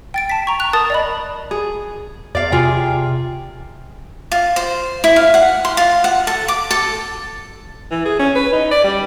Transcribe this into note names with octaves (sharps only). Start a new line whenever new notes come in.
G5 A6 D7
A5 B6
A#5 C#6
F#6 F7
A#4 A5 D#6 A6
D5 D#5 B5
G#4
E2 D5 F5
C3 F4 G#4 G5
F4
C5
E4
F5
F#5
C6
F4
F#5
A4
D6
A4
E3
G#4
C#4
B4
D#4
D5
G3